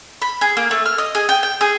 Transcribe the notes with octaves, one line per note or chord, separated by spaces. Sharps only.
B5
G#4
A#3
A3
F6
D#5
G#4
G5
G5
G#4